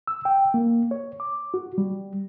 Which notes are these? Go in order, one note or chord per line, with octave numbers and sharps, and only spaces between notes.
E6
G5
A#3
C#5
D6
F#4
G3